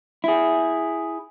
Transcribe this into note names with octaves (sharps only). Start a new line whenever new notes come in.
E4 G#4